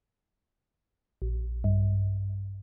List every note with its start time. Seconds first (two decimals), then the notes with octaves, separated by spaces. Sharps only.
1.22 A#1
1.64 G2